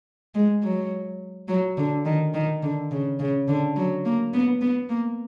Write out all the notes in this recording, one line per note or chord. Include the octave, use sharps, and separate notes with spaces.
G#3
F#3
F#3
D3
D#3
D#3
D3
C#3
C#3
D3
F#3
A#3
B3
B3
A#3